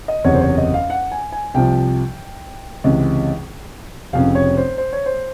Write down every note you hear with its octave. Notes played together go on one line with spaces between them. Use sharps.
D#5
F#1 E2 C3 C#5
C5
C#5
D#5
F5
F#5
G#5
G#5
C2 C3 F3 G5
C#2 C3 E3
F1 F2 C#3 F5
C#5
C5
C5
C#5
C5